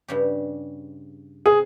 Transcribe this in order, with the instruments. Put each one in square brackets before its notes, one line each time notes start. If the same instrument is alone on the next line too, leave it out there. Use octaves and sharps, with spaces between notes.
[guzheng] G2 C#3 G4
[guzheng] C3 [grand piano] G#4